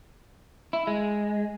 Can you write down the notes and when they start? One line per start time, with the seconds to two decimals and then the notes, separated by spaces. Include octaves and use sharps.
0.73 E4
0.87 G#3